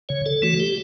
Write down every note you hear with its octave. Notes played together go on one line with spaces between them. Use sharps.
C#3 C#5
A4
E3 A3 F#4
G4